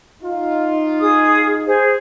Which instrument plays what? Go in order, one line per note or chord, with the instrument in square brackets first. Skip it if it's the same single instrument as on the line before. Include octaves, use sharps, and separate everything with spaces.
[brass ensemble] D#4 F4
[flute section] G#4 D#6
G#4 C5